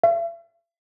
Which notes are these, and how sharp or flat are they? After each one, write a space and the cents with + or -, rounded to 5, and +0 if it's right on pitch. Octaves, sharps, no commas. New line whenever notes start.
E5 +45